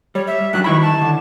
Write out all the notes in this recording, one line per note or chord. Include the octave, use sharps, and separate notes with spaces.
G3 C#5
E5
G2 F#3 F#6
D#3 E4 B5 C#6
A5
D3